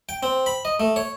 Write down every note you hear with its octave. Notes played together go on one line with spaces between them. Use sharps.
G5
C4
B5
D#5
A3
C#5